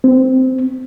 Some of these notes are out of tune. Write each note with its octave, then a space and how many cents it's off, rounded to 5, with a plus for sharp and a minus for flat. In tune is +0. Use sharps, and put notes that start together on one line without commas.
C4 -15